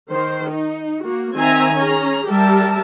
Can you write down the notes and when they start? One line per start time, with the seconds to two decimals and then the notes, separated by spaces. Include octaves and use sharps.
0.11 D#3 C5
0.50 D#4
1.03 A#3 F#4
1.35 D#3 C4 E5 G#5 A#5
1.76 C#4 G#4 A#5
2.28 G3 G4 A#4 E5 A5